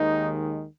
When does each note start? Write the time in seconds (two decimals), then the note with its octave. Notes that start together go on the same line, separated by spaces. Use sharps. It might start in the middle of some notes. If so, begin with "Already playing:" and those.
Already playing: D#2 D#3 G#3 D#4